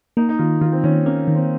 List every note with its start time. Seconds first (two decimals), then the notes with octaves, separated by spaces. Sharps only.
0.17 A#3 D#4
0.29 D#4
0.39 D#3 F4
0.61 D#3 F4
0.72 C4
0.84 D#3 C#4
1.06 A#3 C#4
1.27 D#3
1.35 C4